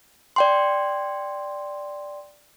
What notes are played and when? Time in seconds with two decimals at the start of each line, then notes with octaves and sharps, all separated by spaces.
0.36 D5 G5 C6